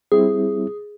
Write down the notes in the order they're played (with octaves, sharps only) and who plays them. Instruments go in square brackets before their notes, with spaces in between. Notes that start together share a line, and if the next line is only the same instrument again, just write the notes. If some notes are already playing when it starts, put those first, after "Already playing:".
[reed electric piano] G3 C4 E4 [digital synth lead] G#4